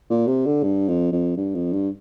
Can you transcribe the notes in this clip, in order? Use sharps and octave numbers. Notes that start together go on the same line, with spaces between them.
A#2
C3
D3
G2
F2
F2
G2
F2
G2